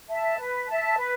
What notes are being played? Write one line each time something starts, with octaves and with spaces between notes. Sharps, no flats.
E5 A5
B4
E5 A5
B4